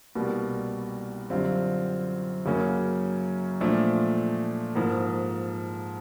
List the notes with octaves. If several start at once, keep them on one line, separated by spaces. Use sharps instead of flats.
C2 B2 G3 A#3
F#2 D3 G3 C4 F4
F#2 C#3 F#3 A#3 C#4
A#2 F3 A3 D4
G#2 F3 A#3